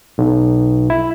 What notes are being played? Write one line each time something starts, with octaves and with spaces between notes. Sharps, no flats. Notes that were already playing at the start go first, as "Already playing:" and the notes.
B1
E4